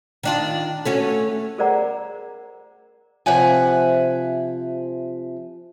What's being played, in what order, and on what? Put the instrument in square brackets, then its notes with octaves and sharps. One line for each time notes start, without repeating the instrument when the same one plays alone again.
[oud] D#3 D4 F4
A3 C#4 F#4
[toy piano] G#4 A#4 C5 D5 F#5 A#5
[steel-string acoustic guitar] C3 F3 E5 F#5 G#5